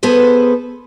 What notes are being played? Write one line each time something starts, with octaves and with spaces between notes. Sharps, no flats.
B3 G#4 A4 B4 C5